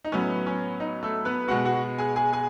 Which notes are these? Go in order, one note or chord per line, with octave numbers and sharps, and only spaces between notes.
D#4
A2 F#3 B3 C#4
C#4
D#4
A3 A4
B3 B4
B2 G#3 B3 F#4 F#5
F#4 F#5
G#4 G#5
G#4 G#5
G#4 G#5